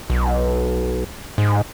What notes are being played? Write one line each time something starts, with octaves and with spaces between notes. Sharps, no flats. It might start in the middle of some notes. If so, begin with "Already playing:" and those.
B1
G#2